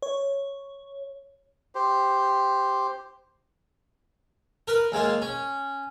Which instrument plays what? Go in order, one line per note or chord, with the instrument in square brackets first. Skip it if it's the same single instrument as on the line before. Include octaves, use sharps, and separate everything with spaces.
[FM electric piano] C#5
[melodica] G4 C5
[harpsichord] A#4 B4
D#2 G#3 A#3 F4
C#4